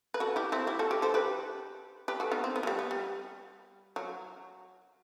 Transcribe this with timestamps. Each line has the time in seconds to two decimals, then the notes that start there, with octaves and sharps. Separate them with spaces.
0.14 B4
0.20 F#4 A4
0.36 E4 G4
0.52 C4 E4
0.67 E4 G4
0.79 F#4 A4
0.91 G4 B4
1.02 A4 C5
1.14 G4 B4
2.08 G4 B4
2.20 F#4 A4
2.32 B3 D#4
2.44 C4
2.56 B3
2.63 F#3
2.67 G3
2.79 B3
2.91 G3
3.96 F#3